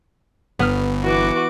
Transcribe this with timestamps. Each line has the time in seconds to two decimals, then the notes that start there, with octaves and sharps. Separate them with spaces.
0.59 G1 B3 F6
1.04 E3 F#4 D6